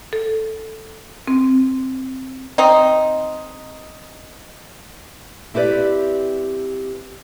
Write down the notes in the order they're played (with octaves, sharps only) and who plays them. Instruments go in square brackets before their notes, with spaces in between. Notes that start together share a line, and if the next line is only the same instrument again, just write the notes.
[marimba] A4
C4
[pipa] C4 D#4
[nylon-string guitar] C4 E4 G4 B4 D5